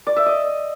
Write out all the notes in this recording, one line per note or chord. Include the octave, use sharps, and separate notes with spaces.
D5
E5
D#5